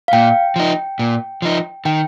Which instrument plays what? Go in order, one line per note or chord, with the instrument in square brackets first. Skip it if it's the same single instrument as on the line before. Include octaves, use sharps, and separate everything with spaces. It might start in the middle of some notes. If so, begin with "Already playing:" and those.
[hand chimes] F5
[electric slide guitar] A#2 [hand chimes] G5
[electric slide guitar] F3 D#4
A#2
F3 D#4
[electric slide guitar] D#3 [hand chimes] G5